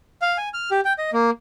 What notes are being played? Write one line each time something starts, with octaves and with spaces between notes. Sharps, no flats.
F5
G#5
F6
G4
G5
D#5
A#3